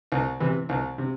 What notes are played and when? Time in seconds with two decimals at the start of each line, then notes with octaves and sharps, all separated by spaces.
0.12 C2
0.40 C3 E3
0.69 C2
0.98 C3